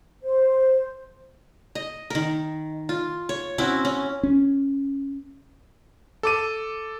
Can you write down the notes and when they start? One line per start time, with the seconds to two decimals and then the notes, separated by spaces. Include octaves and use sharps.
0.22 C5
1.75 D#5
2.10 D#3 A#4
2.89 F4
3.29 C#5
3.58 C4 C#4 E4 F#4
3.85 C#4
4.23 C#4
6.23 A4 D6 D#7